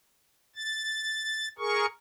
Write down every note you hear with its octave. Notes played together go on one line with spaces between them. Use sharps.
A6
G#4 A#4 C#6